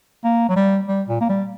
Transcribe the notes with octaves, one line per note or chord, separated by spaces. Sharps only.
A#3
F#3
G3
G3
A#2
A#3
G3